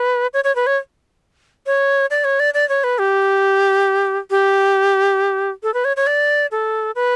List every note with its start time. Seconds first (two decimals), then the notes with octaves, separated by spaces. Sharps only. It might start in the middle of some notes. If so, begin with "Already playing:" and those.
Already playing: B4
0.34 C#5
0.44 C#5
0.56 B4
0.67 C#5
1.66 C#5
2.10 D5
2.24 C#5
2.40 D5
2.54 D5
2.69 C#5
2.84 B4
2.99 G4
4.31 G4
5.63 A4
5.74 B4
5.85 C#5
5.97 C#5
6.07 D5
6.51 A4
6.95 B4